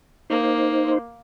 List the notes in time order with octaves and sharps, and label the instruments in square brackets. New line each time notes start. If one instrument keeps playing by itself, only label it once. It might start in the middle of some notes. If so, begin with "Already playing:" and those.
[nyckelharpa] A#3 [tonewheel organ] D#4 C5